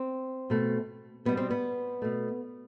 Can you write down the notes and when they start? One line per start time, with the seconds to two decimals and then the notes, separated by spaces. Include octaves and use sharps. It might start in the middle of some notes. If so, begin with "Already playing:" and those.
Already playing: C4
0.50 B2 A3
1.25 B2 G3 B3
1.37 C4
1.50 B3
2.02 B2 A3